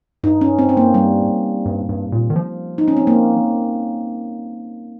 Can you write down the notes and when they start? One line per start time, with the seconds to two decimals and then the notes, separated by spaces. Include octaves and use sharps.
0.23 G2 D#4
0.41 C#4
0.59 C4
0.69 C4
0.77 A#3
0.94 G3
1.65 G2
1.89 G2
2.12 A#2
2.30 D#3
2.36 F3
2.78 D#4
2.88 C#4
2.97 C4
3.07 A#3